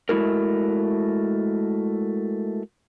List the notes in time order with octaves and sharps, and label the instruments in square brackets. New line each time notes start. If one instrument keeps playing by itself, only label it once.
[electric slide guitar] G#3 A3 E4 F#4 A#4